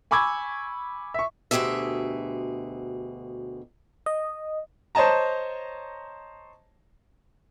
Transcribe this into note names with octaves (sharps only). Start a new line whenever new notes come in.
G#5 B5 C#6 D6 E6 G#6
E5 C#6
D2 B2 F#3 G4 G#4 E5
D#5
C5 C#5 D#5 A5 A#5